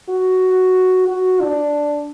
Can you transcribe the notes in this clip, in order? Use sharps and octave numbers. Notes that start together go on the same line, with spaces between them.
F#4
F#4
D4